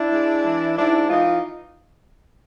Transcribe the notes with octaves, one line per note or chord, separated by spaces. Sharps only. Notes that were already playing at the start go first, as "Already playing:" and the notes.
Already playing: D4 E4
G#3
E3
G#2 D4 E4
E3 D#4 F4